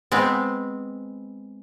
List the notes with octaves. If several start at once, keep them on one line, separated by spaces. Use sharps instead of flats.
G#3 B3 C4